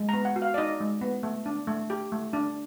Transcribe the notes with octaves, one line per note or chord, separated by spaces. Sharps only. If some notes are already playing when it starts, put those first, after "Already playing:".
Already playing: G#3
B3 A#5
F#5
F#4
F5
D5
D#4 D#5
G#3
B3
A3
D4
A3
G4
A3
D4